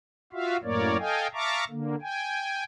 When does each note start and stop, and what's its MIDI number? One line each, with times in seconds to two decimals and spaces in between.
0.33 0.57 65
0.33 0.57 66
0.33 0.57 76
0.33 0.57 77
0.63 0.97 42
0.63 0.97 45
0.63 0.97 58
0.63 0.97 70
0.63 0.97 73
0.63 0.97 74
0.99 1.27 69
0.99 1.27 75
0.99 1.27 77
0.99 1.27 79
0.99 1.27 80
1.33 1.64 76
1.33 1.64 77
1.33 1.64 81
1.33 1.64 82
1.33 1.64 85
1.33 1.64 86
1.70 1.95 50
1.70 1.95 58
2.02 2.64 79
2.02 2.64 80